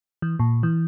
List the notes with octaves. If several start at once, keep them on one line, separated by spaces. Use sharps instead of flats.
E3
A#2
E3